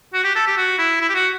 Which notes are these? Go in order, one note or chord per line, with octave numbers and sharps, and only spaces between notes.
F#4
G4
A4
G4
F#4
E4
E4
G4
F#4